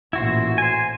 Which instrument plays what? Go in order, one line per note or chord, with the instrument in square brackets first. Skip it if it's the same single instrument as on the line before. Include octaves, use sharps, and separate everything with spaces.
[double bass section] A1 A#2 [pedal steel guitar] E4 F#4 C5
[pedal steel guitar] C5 G#5